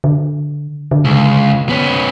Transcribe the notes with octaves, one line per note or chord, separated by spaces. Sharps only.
D3
D3
C#2
B3 C#4